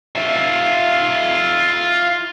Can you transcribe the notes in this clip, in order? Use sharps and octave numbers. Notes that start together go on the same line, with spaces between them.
F4 E5